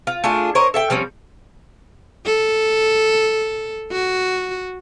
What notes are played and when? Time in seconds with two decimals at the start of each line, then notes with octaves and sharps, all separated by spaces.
0.07 F4
0.24 A3 D4 F4 G#4
0.55 A#4 C5 C#5 D#5
0.74 A4 E5 G5
0.90 F3 G3 C4 C#4
2.25 A4
3.92 F#4